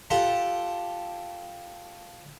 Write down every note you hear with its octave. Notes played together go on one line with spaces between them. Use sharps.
F4 G4 A4 F#5